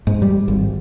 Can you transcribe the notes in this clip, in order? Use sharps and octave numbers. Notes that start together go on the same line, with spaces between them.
G#2
G3
G#1